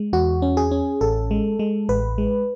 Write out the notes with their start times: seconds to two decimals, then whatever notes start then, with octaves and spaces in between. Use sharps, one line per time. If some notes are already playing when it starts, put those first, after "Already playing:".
Already playing: G#3
0.13 E2 F#4
0.42 C#4
0.57 G#4
0.71 C#4
1.01 A1 A4
1.31 G#3
1.59 G#3
1.89 A1 B4
2.18 G#3